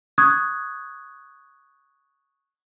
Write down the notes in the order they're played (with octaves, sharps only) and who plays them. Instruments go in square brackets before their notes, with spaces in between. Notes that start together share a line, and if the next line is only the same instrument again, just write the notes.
[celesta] C#6 D#6 F#6 G#6